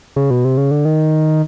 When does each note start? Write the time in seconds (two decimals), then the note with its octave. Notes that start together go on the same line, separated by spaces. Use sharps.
0.16 C#3
0.30 B2
0.45 C3
0.57 C#3
0.71 D3
0.85 D#3